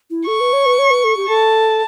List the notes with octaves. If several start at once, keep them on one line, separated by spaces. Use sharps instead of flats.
E4
A4 C#6
B4
C#5
B4
C#5
B4
A4
G4
A4 A5